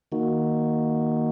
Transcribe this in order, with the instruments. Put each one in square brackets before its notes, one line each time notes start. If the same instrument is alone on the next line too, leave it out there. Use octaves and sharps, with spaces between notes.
[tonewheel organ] D#3 A#3 D#4 F#4